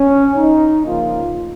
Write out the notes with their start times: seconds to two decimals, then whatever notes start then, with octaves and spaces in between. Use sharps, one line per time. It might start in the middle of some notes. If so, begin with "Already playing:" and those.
Already playing: C#4
0.36 D#4
0.87 C#3 F3 A#3 F4